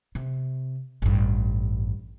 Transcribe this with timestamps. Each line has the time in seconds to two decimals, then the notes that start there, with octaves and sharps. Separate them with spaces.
0.15 C3
1.02 A1 G2